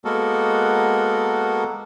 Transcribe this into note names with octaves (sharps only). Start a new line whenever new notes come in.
G#3 A#3 B3 F#4 A4 A#4